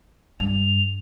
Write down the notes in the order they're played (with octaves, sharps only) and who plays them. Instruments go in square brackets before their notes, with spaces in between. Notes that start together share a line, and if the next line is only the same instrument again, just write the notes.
[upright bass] G2 [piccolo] F7